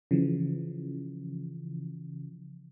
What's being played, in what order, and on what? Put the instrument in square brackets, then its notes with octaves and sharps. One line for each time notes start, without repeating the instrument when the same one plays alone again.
[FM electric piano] C#3 E3 F3